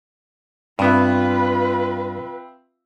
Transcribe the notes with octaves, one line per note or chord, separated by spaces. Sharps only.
G2 B3 C4 F4 B4 E5